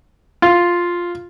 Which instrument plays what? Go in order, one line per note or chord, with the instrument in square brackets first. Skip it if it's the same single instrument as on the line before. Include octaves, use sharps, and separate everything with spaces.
[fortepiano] F4